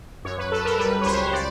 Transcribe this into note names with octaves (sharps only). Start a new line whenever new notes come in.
F#2 C#5
B4
F#2 A4
A#4
G3 B4
C#5
C#2 C5
D5